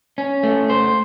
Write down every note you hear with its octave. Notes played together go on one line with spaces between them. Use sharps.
C#4
A3
C5